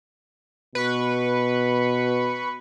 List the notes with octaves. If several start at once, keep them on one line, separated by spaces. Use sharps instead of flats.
B2 B4 C#6